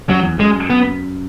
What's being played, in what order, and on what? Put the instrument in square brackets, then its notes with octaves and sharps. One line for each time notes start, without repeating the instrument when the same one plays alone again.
[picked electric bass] F#2 [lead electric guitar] F#3
[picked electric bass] E2
[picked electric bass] F#2 [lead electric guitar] G#3
[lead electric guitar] B3